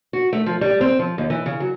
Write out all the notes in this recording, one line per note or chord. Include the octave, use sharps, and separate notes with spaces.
F#4
A3
F3
G3
C4
F3
D#2
E3
C#3
F#3